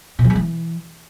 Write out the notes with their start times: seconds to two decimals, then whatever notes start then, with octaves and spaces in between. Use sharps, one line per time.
0.19 A#2
0.24 F3
0.30 G#3
0.35 E3